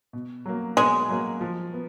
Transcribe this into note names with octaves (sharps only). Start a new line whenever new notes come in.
B2
F#3 A#3
B2 G#3
F#3 A#3
F3
B3